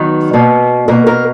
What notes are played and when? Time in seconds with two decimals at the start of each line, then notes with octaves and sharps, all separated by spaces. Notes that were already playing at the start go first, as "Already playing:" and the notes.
Already playing: D#3 F#3 B3 B4
0.33 B2 A#3
0.88 B2 A#3 A#4
1.07 A#4